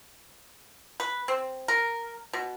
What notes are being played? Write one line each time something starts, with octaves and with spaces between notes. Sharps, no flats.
B4
C4
A#4
B2